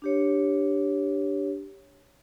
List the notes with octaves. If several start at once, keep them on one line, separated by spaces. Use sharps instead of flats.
D4 G4 C#5